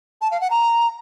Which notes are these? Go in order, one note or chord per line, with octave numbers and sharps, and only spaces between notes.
A5
F5
F#5
A#5